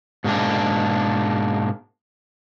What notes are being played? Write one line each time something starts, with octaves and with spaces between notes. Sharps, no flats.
G#2 B2 A#3 D4